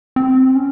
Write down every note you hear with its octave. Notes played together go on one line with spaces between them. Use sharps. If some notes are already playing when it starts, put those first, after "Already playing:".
C4
C#4